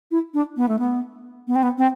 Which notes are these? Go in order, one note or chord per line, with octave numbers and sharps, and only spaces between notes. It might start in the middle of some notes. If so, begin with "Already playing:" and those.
E4
D4
B3
A3
B3
B3
C4
B3
C4